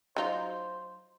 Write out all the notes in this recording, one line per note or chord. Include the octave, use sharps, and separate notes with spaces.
F#3 D#4 F4 C5